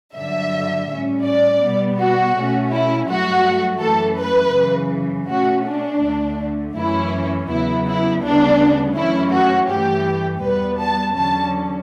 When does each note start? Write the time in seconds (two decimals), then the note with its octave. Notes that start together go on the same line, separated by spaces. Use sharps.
0.14 G2 D3 F#3 E5
0.88 A2 G3 C#4
1.25 D5
1.62 B2 G3 B3
1.98 F#4
2.35 B2 A3 C#4
2.72 E4
3.08 G2 F#3 A3 F#4
3.81 F#2 E3 A3 A4
4.18 B4
4.55 F#2 C#3 E3
5.29 B2 A3 C#4 F#4
5.66 D4
6.02 D2 D3 A3
6.76 F#2 E3 A3 C#4 E4
7.49 E2 C#3 F#3 B3 E4
7.87 E4
8.22 D2 C#3 G3 B3 D4
8.96 F#2 E3 A3 C#4 E4
9.33 F#4
9.70 G2 E3 A3 G4
10.43 E2 B2 G3 B3 B4
10.81 A5
11.17 E2 D3 F#3 C#4 A5